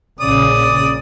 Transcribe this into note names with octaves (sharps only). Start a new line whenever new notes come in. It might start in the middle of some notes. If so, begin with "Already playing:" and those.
A#1 C#3 D5 D#6